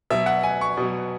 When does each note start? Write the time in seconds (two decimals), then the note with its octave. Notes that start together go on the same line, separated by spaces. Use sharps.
0.10 B2 F#3 E5
0.26 F#5
0.43 G#5
0.61 C#6
0.78 B2 F#3